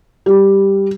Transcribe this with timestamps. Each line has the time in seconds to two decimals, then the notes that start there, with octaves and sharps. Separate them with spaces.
0.26 G3